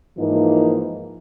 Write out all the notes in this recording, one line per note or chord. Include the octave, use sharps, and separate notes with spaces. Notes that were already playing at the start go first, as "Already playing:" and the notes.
G#2 E3 F3 A#3 D#4